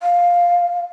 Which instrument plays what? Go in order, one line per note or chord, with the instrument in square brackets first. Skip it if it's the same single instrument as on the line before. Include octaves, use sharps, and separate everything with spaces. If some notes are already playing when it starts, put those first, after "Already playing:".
[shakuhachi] F5